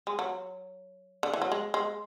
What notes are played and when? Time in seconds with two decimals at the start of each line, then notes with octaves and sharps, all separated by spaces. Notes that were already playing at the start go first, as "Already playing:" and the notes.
0.07 G#3
0.19 F#3
1.23 D3
1.33 E3
1.42 F#3
1.52 G#3
1.74 G#3